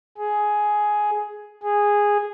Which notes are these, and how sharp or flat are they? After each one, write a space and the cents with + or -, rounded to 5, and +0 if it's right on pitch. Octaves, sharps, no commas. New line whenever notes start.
G#4 +10
G#4 -10